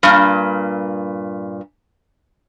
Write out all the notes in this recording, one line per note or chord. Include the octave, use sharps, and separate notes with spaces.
G2 A#2